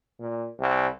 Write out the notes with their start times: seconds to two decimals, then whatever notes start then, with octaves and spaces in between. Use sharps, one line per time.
0.20 A#2
0.59 C2